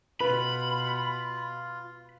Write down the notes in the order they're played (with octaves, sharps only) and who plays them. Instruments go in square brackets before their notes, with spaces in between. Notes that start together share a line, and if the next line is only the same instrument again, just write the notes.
[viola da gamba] B2 [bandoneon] F4 [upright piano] B4 [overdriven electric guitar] B5